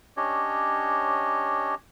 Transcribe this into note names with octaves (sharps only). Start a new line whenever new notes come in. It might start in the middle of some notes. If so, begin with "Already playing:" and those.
C#4 D4 G4 C#5 D#5